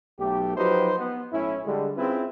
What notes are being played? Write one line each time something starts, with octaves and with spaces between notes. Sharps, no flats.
B1 A3 G4
F3 F#3 D#4 G4 B4 C5
B3
B1 A2 C#4 E4
D3 G3 G#3
C4 C#4 E4 F4 G#4 B4